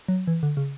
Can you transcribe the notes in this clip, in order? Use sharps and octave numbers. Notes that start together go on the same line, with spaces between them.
F#3
E3
D3
C#3